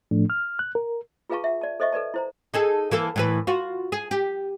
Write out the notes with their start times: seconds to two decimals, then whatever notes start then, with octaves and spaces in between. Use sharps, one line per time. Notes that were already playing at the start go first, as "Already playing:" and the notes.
0.11 A2 F3 A3 D4
0.30 F6
0.59 F#6
0.75 A#4
1.29 F4 G#4 B4 F5 A5 C#6
1.44 E5 F#5
1.61 D5 A5
1.80 A4 C5 D#5 E5 C#6
1.92 A4 B4 D5 A5
2.14 E4 C5 A#5
2.54 D#4 G#4 A4
2.91 E3 A#3 A4
3.16 A2 E3 B4
3.47 F4 F#4
3.92 G#4
4.11 G4